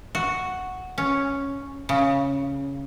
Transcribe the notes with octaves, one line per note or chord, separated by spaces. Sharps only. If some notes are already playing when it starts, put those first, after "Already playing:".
F#4
C#4
C#3